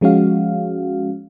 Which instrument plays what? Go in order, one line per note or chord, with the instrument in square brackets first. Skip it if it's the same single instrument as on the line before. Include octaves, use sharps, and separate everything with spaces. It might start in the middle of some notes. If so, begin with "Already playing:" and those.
[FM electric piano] F3 G#3 C#4 F#4 F5